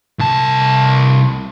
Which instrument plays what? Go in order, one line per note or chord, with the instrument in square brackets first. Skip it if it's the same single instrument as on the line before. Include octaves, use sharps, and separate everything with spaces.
[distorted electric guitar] C2 A5